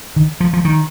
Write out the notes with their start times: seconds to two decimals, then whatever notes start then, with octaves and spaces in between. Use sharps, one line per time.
0.16 D#3
0.40 F3
0.53 F3
0.65 D#3